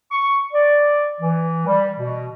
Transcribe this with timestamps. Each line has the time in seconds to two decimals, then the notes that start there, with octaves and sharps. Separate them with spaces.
0.11 C#6
0.52 D5
1.21 E3
1.67 G3
1.98 B2